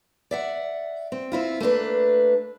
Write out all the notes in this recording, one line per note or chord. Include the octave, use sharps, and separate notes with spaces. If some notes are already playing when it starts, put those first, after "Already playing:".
D5 E5 F#5
C4
C4 E4 F4
A3 A#3 D4 B4